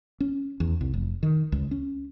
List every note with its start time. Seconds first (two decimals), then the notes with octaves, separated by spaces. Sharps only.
0.20 C#4
0.60 E2
0.81 C2
0.94 F1
1.23 D#3
1.52 C#2
1.71 C#4